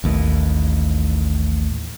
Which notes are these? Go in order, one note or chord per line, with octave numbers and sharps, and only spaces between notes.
A1 D#2 A2